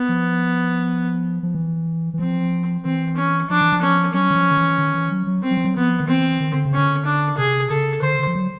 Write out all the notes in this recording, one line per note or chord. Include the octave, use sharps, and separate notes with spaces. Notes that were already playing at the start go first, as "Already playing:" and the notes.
Already playing: B3
F3
F3
E3
E3
F3 C4
E3 C4
C#4
F3 D4
E3
F3
C#4
F#3 C#4
E3
F3
D#3
E3
D#3
E3
F#3
F#3
C4
F#3
F3
F#3
F3 B3
D#3
E3 C4
D#3
D3
C#3
D3 C#4
D4
C3 G#4
C#3 A4
D3 C5
D3
F3
F#3